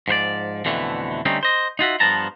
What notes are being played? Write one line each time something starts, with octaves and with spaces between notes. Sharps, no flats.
G#2 F3 C5 D5
F2 B2 D3 E3 A3
D3 G3 A3 C4 C#4 D#4
C5 D#5
D#4 F4 F#4 E5
G2 F3 B3 A5 A#5